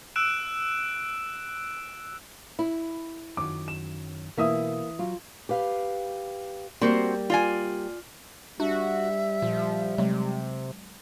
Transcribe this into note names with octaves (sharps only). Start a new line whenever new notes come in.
E6 F#6 D7 E7
E4
F#2 D#3 F#3 D6
E7
B2 E3 A#3 E5 D#6
F#3 F4
G4 B4 F5
G3 A#3 C4 F#4 C5
F4 D5 G#5
G3 D4 F#4 E5
A#2 F3
C3 F#3 G#3